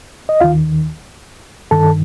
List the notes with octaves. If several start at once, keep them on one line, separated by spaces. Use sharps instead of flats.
D#5
D#2 D#3 F4 F5
G2 D#3 A4 A5